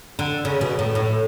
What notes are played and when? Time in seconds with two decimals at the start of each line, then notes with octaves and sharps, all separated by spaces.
0.19 D3
0.45 C#3
0.61 B2
0.79 A2
0.95 A2